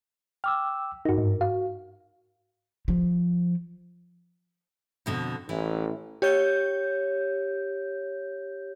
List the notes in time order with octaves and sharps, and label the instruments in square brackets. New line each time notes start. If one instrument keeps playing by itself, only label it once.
[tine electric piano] G5 D6 E6 [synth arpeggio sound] F6
[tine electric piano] G2 A#4 [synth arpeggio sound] D#4 F#4
[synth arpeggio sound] G#2
[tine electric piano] F#4 [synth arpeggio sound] F5
[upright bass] F3
[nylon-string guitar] F2 B2 D3
[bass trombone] A1 [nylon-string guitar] E3
[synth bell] G4 C#5 G6